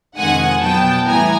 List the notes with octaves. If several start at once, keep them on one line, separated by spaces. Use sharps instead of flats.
F2 C3 D#3 G#3 F#5 G#5
B2 F#3 B3 G5 A5
A2 E3 G3 B3 G#5 A#5